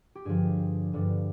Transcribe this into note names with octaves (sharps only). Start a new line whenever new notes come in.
G4
G2 D3 F3 G#4
G2 D3 F3